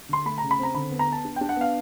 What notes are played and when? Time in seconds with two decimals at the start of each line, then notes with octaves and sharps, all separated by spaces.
0.09 D3 C6
0.26 A3 B5
0.38 A#5
0.43 C#3
0.51 B5
0.59 C4 A#5
0.75 D3 B5
0.92 B3
0.99 A#5
1.08 B3 A5
1.25 D4
1.36 D4 G5
1.49 F#5
1.56 B3 F5